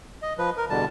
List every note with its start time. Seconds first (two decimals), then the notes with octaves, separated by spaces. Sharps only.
0.22 D#5
0.38 F3 B4
0.57 A#4
0.70 E2 B2 D3 G3 A5